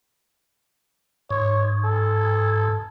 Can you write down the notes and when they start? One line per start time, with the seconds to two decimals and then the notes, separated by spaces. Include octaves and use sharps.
1.30 G#2 C#5
1.85 A4